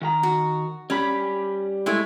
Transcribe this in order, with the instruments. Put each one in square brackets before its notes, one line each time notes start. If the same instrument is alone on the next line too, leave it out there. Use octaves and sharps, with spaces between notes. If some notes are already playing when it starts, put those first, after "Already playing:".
[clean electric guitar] D#3 F#5 A#5
[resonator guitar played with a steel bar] F#4
[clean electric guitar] G3 B5 [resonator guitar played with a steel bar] C#4
[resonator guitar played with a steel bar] G#3 A3 E4